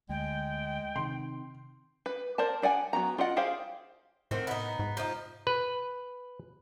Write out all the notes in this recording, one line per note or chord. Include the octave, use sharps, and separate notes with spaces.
D2 G#3 G5
C3 D#3 C6
B4
A#4 C5 D5 A5
D4 D5 F#5 G#5
F#3 B3 F#4 A#5
F4 D5 D#5 F#5
G4 G#4 C5 F5
A2 D3 D#3 C4
B3 D#4
G#2
F3 D#4
B4